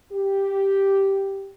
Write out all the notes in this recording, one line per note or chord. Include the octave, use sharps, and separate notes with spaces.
G4